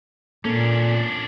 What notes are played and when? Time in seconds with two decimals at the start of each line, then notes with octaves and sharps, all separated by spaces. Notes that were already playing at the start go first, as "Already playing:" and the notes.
0.45 A#2 A#3 C#4 D4 A4